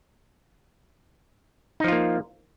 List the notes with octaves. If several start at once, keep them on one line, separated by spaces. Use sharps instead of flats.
F3 A#3 D#4 F4